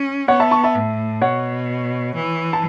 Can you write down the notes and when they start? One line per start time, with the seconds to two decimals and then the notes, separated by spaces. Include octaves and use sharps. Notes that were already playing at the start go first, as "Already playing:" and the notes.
Already playing: C#4
0.28 B3 C#5 F#5
0.40 E5 A5
0.51 A5 C#6
0.64 E5 A5
0.75 A2
1.22 B2 C#5 F#5
2.15 E3
2.53 A5